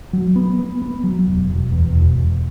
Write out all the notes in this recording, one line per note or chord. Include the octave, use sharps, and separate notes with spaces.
F#3
B3
B3
B3
F#3
E1
E1
E2
E1
E1